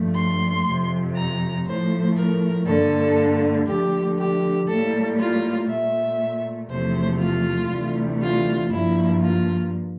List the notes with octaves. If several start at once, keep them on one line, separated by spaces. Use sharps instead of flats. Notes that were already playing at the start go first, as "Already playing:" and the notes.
Already playing: G2 F3 A3
C6
F2 C3 F3
A#5
A2 F3 A3 C5
A#4
G2 D3 G3 A#3 A4
D2 D3 F3 A3 G4
G4
A2 G3 A#3 A4
F4
A#2 A3 E5
E2 C3 F3 A3 C5
F4
D2 C3 E3 G3
F4
G2 F3 A#3 E4
F4